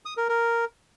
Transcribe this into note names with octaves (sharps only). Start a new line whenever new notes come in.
D#6
A#4
A#4